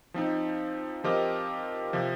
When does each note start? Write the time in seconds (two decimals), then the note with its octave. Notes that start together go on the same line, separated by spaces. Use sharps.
0.14 F3 C4 D#4
1.04 F3 C4 G4 A#4 D#5
1.93 C3 F3